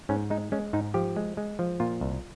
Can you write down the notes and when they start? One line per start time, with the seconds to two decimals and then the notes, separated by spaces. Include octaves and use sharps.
0.09 G#2 C#4
0.30 G#3 D#4
0.52 G#3 C#4
0.73 G#2 D#4
0.94 F3 G4
1.16 G#3
1.37 G#3
1.59 F3
1.80 A#2 F4
2.01 C2